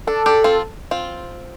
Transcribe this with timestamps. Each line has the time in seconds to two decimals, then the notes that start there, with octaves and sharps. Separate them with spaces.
0.07 D4 A4
0.26 D4 G4
0.44 C4 F4
0.91 C4 F4